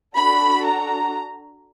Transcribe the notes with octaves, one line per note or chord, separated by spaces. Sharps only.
D4 F#4 A4 B5
A#5